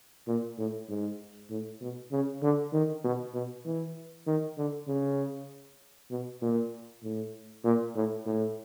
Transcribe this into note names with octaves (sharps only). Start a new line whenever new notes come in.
A#2
A2
G#2
A2
B2
C#3
D3
D#3
B2
B2
E3
D#3
D3
C#3
B2
A#2
A2
A#2
A2
A2